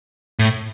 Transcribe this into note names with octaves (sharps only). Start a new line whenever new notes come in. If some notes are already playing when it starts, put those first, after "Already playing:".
A2